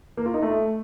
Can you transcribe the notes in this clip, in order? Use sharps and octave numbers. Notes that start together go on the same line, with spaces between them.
A#3
F4
D#4
A3